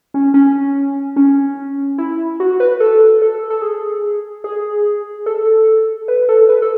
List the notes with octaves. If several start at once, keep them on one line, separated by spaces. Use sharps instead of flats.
C#4
C#4
C#4
E4
F#4
B4
A4
A4
A4
G#4
G#4
A4
B4
A4
B4
A4